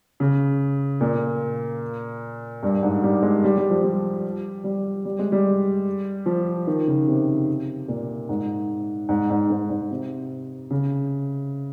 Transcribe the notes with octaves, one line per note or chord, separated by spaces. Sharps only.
C#3
A#2
G2
G#2
G3
G#3
G3
G3
F3
G3
G3
G3
G#3
G3
F3
D#3
C#3
C3
A#2
G#2
G#2
G#2
G#2
G#2
C3
C#3